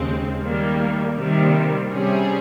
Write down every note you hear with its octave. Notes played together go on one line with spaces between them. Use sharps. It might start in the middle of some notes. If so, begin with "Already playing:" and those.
Already playing: D#2 C#3 G#3 C4
D#3 G3 A#3
C3 D#3 G3 A#3
C3 G3 C#4 G#4